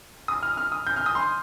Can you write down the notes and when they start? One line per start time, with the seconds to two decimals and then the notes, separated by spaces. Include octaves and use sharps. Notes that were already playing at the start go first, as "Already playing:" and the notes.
0.28 D#6
0.43 F6
0.57 F6
0.72 D#6
0.87 G6
0.96 F6
1.06 D#6
1.15 C6